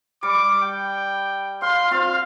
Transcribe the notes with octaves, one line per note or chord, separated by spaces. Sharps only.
G3 D6
G5
F5 C6
C4 F4 F5